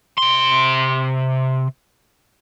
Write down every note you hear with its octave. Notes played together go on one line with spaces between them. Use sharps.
C3 C6